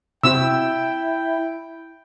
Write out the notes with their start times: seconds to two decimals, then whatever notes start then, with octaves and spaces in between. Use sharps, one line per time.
0.23 C3 C4 E4 F#4 G5 E6